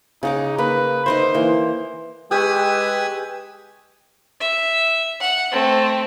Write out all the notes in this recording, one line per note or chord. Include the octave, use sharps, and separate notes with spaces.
C#3 D#4 F#5 D6
A#3 B4
D#4 A#4 C5 E5
E3 A#3
G#3 G4 B4 G#5 C#6 D#6 E6
E5
F#5
A3 C4